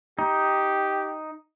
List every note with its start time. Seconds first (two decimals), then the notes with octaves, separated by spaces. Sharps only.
0.19 D#4 G4